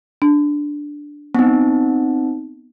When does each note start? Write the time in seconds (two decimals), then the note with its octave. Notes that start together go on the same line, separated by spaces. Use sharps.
0.22 D4
1.35 B3 C4 D#4